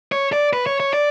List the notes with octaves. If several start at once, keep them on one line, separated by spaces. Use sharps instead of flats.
C#5
D5
B4
C#5
C#5
D5